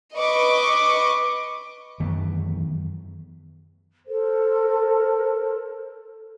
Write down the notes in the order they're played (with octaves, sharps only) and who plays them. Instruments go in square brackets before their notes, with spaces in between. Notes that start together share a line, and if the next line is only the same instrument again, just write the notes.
[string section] B4 D#5 C#6 D6
[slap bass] F#2 D#3 E3 B3
[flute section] A4 A#4 C5